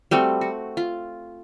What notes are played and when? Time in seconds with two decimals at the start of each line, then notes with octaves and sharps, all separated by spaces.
0.11 G3 A3 C4 F#4
0.41 F#4
0.77 F4